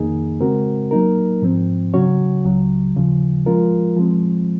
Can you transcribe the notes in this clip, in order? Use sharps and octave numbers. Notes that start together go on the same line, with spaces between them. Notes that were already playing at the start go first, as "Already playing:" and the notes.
Already playing: F2 D#3 A#3 D#4 G#4
C#3 G#3 C4 F#4 A#4
F#3 A#3 D#4 A#4
G#2 F3 C4
C#3 F#3 C#4 F#4 C#5
C#2 C#3 F#3
D#2 C#3 F3
F3 G#3 C#4 F4 A#4
F3 G#3 C4